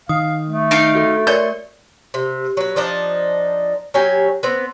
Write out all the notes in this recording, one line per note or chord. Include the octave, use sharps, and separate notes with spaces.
D#3 F5 D#6
A3
D#4 F5 D7
F#4 A4
A#4 C#5 D5 G6
C3
F#3 B4
F3 D4 D#4 D5
F#3 C#4 G4 G#5
B3 C4